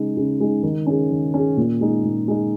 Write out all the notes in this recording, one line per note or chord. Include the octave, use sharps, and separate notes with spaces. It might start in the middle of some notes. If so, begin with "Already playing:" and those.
Already playing: C#3 G#3 D#4
C#3
G#3 D#4
D#3
C#4 G#4
D#3
C#4 G#4
A#2
G#3 D#4
A#2
G#3 D#4